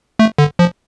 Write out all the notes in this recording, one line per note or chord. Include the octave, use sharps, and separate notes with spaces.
A3
D3
F3